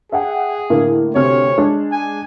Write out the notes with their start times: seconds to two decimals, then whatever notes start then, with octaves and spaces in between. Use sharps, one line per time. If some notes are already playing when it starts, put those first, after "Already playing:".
0.12 G#4 E5 F#5 G5
0.70 A2 D3 A#3
1.15 D2 C3 C#5 F6
1.58 G#3 D4 G#4
1.92 G#5